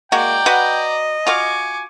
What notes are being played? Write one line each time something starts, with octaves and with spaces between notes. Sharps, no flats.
G#3 A#3 F#4 D5 G5 A#5
F#4 B4 D#5 F#5
F4 F#4 F5 G#5 C#6 D6